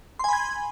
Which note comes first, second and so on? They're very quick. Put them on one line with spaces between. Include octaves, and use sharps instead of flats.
C6 G#5 B5 G#6